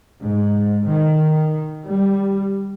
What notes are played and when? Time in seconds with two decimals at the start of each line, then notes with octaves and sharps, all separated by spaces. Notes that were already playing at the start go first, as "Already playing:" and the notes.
0.24 G#2
0.87 D#3
1.86 G3